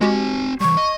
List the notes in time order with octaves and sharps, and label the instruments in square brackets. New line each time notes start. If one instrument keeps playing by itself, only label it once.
[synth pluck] G#3 F#4 G4 [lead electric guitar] C4 G#5
[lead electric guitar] E3 G3 [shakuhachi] C#6
[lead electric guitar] D#5